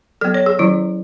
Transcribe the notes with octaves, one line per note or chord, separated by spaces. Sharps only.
F#3 B3 A4
C#5
G#4
D#3 F#3 C#4 E4